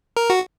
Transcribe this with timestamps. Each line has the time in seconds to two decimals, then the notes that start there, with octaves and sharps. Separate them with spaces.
0.17 A#4
0.30 F#4